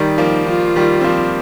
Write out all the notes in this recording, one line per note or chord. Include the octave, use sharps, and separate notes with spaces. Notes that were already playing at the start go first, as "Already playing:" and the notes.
Already playing: D#3 G3 D#4
F3 A#3
F3 F4
D#3 G3
C4
F3 A#3